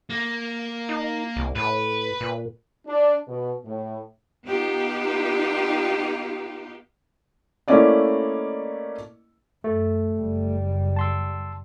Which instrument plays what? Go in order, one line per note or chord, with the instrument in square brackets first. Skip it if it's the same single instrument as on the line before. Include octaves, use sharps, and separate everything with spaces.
[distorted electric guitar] A#3
[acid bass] D#4
C2
[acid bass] A2 [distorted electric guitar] B4
[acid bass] A#2
[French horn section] D4
B2
A2
[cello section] B3 D#4 F4 G4
[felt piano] A3 A#3 C#4 E4 D5 D#5
[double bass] F#2 [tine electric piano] A3
[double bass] F#1 G3
[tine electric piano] A5 C6 E6